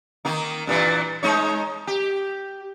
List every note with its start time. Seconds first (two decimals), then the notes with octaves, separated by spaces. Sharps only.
0.25 D#3 A#3 D#4
0.67 G2 A#2 E3
1.23 G#3 D#4 C#5
1.87 G4